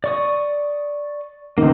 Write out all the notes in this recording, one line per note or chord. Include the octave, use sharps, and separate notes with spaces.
D5 C#6 D#6
C#2 D#3 A#3 C4